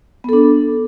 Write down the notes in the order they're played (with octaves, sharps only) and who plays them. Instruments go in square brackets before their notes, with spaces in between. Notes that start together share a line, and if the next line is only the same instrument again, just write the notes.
[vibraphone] B3
A4
D4